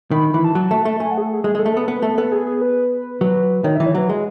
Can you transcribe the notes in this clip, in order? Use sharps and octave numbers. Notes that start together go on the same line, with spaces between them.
D#3 B5
E3 B5
A5
F#3
A3
A3
A3 G#5
F#5
G#4
A4
G#4
G#3 G#4
G#3 A4
A3
B3 A4
B3 B4
A3 A4
B3 A4
G#4
G#4
B4
F#3 B4
D#3 C#5
E3 E5
C#5
F#3 B4
G#3 G#4